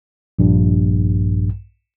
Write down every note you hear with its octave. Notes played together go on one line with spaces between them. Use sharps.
A#1 G2